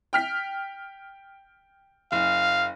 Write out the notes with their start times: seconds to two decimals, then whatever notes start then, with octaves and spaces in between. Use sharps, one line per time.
0.13 G5 F6 B6
2.12 F#1 F5